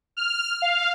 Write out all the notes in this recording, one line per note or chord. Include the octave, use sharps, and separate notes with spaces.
F6
F5